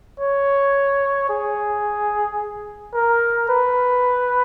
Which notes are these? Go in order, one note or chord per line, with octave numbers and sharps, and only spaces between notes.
C#5
G#4
A#4
B4